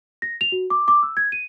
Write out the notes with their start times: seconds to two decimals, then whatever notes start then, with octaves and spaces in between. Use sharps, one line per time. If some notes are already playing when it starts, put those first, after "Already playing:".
0.22 A#6
0.41 F7
0.52 F#4
0.70 D6
0.88 D6
1.03 E6
1.17 G#6
1.32 D#7